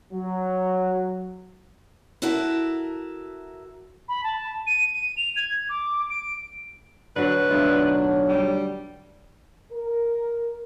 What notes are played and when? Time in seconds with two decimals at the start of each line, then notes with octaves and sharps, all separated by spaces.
0.13 F#3
2.22 E4 F#4 A4 A#4 E5
4.08 B5
4.24 A5
4.67 D#7
4.94 D#7
5.17 F7
5.36 G#6
5.69 D6
6.10 D7
7.16 D3 F#3 B4
7.50 B1 F#3 A3 B3 D4 F4
8.29 G3
9.72 A#4